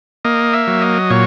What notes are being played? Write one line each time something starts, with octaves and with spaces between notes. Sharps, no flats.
A#3 D#5
E5
F#3
D#5
A#2 C#5